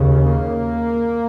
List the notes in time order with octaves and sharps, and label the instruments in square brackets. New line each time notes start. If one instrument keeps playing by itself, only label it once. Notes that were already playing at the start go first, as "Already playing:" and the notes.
Already playing: [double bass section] D#2 C#3
A#3